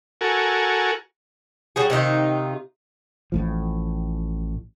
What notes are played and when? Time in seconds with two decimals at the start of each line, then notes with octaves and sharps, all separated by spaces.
0.21 F#4 A4 A#4 G#5
1.76 F#3 G3 G#4
1.90 C3 D#3 D#4 F4
3.32 A1 A2 F3